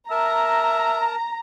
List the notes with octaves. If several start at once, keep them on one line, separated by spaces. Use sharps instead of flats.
A#4 E5 A5 A#5